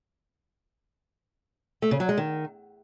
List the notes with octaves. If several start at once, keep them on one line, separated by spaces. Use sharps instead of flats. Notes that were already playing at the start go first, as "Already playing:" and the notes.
A3
C#3
F#3
G#3
D#3